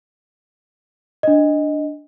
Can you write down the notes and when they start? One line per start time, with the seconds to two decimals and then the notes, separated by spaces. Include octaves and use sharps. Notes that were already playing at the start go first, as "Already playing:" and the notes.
1.23 D4 D#5